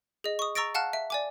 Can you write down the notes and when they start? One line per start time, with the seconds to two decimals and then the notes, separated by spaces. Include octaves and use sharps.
0.24 G#4 D#5
0.39 C#6 D#6
0.55 A#5 C#6 E6 A6 A#6 D7
0.75 F5 F#5 A5 F6 F#6
0.93 E5
1.10 D5 G#5 D6